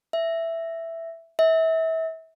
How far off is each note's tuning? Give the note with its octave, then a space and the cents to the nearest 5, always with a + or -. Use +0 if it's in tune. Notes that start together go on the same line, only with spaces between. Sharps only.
E5 +5
E5 -30